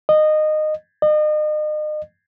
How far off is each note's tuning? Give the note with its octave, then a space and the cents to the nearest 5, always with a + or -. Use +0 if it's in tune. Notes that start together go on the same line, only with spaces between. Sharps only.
D#5 -15
D#5 -35